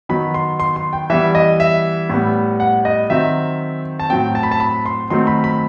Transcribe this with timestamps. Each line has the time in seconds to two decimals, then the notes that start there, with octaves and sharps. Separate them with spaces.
0.09 D#3 F#3 B3 B5
0.34 C6
0.60 C6
0.76 C6
0.93 G5
1.10 E3 G3 B3 E5
1.35 D#5
1.60 E5
2.10 A2 G3 B3
2.60 F#5
2.85 D#5
3.10 D#3 F#3 C4 E5
4.00 A5
4.10 A2 F#3 C4 G5
4.35 A5
4.43 B5
4.51 A5
4.60 B5
4.86 C6
5.10 D#3 F#3 A3 C4 C6
5.27 B5
5.44 B5